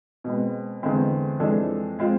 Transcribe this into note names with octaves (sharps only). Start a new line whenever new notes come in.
B2 G#3 C4
E2 D3 G#3 C4
F2 E3 G#3 D4 A4
G#3 C4 F4